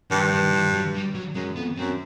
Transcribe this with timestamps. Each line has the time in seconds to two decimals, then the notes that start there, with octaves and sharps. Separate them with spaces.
0.11 G2 D#3
0.32 D#3
0.53 E3
0.73 F#3
0.95 G3
1.15 F#3
1.35 F#2 G#3
1.56 F2 B3
1.78 F#2 C4